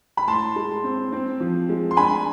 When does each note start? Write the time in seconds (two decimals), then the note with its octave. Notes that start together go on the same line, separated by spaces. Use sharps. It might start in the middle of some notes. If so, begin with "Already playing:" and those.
0.17 B5
0.28 A2 A5 C6
0.56 G#3
0.84 C4
1.12 C4
1.40 F3
1.69 G#3
1.91 C6
1.97 D4 G#5 B5